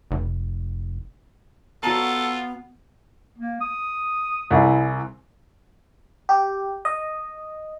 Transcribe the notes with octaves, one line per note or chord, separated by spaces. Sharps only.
F1
B3 F4 F#4 A4 A5 A#5
A#3
D#6
C2 E4 G#4
G4
D#5